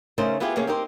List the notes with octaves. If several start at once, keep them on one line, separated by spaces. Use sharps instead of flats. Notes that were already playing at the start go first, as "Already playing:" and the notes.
C#3 A3 C#4 D#4 A#4 C5
B3 E4 F4 G4 G#4 B4
C3 A#3 C#4 G#4 C#5
C4 D#4 G4 A#4 C5